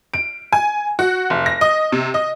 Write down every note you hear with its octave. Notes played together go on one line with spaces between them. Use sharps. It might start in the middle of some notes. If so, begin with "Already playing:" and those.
D7
G#5
F#4
F1
A#6
D#5
C3
D#5